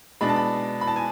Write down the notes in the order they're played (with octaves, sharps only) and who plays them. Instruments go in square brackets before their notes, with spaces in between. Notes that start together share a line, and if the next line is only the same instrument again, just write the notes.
[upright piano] B2 G#3 D4 B5
A5
B5
B5
A5
G#5